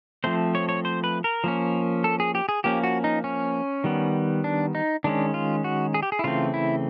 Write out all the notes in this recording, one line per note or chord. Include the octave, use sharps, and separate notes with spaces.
F3 A3 C4 C5
C#5
C#5
C5
B4
A#4
F3 A#3 C#4
A4
G#4
G4
G#4
F3 A#3 C#4 G4
F#4
D#4
C#4
D#3 G3 B3
D4
D#4
D#3 G#3 C#4 D4
F4
F#4
G#4
G4
G#4
E4
C#3 E3 A3 C4 F4
E4